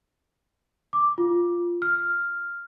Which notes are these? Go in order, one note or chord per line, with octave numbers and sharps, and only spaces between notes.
D6
F4
F6